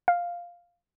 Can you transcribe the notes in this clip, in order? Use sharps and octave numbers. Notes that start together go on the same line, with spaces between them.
F5